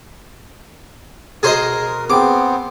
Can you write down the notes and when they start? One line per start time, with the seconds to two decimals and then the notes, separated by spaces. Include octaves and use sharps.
1.43 B2 G#4 A#4 C5 D#5
2.10 B3 C4 G#4 G5 D6